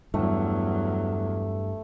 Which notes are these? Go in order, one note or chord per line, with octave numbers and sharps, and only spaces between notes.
E2 G2 F#3 A3